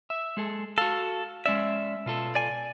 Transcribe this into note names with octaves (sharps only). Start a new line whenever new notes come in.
E5
G#3 G#4 A4
F#4 A4 F5
G#3 C#4 D5 E5
B2 F4 A4
D5 G#5